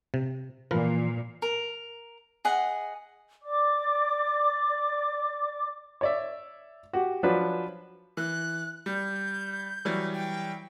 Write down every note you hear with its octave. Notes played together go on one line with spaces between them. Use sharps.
C3
A#2 E3 F3 A#4 B4
A#4
G#4 D#5 F#5
D5 D6
C#5 D5 E5
F#4 G4
F3 F#3 D4 B4
E3 F#6
G3 G6
E3 F#3 G3
G5